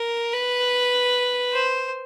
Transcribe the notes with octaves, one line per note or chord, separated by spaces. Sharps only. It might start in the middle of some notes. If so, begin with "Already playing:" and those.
Already playing: A#4
B4
C5